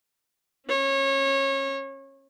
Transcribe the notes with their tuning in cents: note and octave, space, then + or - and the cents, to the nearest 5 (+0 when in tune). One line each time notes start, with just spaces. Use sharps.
C#4 -25 C#5 -25